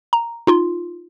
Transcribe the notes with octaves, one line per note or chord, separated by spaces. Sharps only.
A#5
D#4 F4 C6